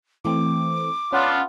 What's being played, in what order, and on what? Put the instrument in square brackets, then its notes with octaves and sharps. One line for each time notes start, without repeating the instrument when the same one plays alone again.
[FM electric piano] E3 A3 C4 [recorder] D6
[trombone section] B3 D4 F4 [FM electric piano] C#4 F#5